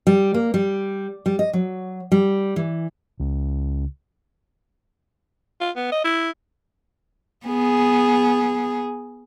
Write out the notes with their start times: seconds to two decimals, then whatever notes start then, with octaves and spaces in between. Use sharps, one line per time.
0.07 G3
0.34 A#3
0.54 G3
1.26 G3
1.39 D#5
1.53 F#3
2.12 G3
2.56 E3
3.20 C#2
5.61 F4
5.76 B3
5.92 D#5
6.04 E4
7.46 B3 G#4